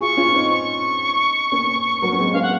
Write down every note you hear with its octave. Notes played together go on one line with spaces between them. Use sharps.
F4 G#4 C#6
C#4 F4
C4 D#4
C#6
A#3 C#4
F#3 A#3
C#4
G#3 C4
A#3 C#4 F5
F#5